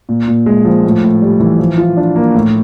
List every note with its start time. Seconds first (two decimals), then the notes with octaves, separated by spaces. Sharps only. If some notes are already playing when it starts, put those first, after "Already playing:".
0.09 A#2
0.28 A#2
0.46 G#3
0.65 F3
0.84 A2
1.03 A2
1.22 G3
1.40 E3
1.59 F3
1.78 F4
1.97 D4
2.16 A#3
2.35 A2